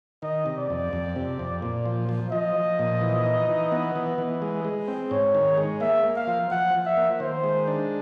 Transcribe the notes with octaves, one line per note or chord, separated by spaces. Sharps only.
D#3 D#5
C3
D5
F2
F2
C3
F2
A#2
F3
F3
F3 D#5
F3
A#2
E3
D#4
E3
B3
E3
E3
G#3
G#3
C4
G#2 C#5
D#3
G#3
A#3 E5
A#3
F5
F3
F3 F#5
F3
E5
A#3
D#3 C5
G#3
D4